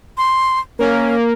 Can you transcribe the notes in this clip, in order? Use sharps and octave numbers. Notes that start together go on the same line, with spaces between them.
C6
A#3 C#4